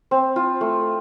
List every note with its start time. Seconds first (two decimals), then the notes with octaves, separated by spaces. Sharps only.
0.11 C4
0.36 F4
0.61 A3